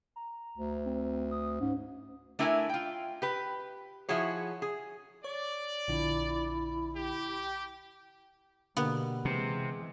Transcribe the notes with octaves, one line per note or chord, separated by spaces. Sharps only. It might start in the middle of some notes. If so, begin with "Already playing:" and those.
A#5
D2
C4
D#6
G#2 C#4
A3 D4 E4 A#4 F#5 G#5
F4 G5
G4 B4
F3 E4 F#4 G#4 C#5
G#4
C#5 D5
A#1 D3 E4
G4
B2 D3 A#3 B3 G4
C3 E3 G#3